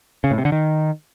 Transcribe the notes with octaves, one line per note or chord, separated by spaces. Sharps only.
C#3
A2
C3
D3
D#3